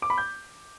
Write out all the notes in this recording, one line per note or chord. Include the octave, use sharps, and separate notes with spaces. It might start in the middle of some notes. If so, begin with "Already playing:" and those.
D6
B5
G6